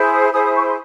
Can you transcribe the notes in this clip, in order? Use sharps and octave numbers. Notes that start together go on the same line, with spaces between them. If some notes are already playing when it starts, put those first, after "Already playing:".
Already playing: E4 G#4 C5
D#6
E4 G#4 C5 D#6
D#6
C#6
C6